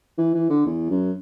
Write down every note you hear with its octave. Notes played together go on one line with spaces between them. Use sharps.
E3
E3
D3
E2
F#2